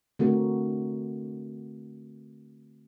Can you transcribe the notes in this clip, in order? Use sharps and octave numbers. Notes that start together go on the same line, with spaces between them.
D3 A3 C4 F#4 A#4